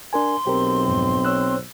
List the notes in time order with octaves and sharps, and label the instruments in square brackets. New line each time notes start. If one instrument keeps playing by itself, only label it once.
[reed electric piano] D4 A#4 G#5 [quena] C6
[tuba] B1 [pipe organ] C4 [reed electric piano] G4 A#4
[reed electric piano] F2 G#2
C#5 E6 F#6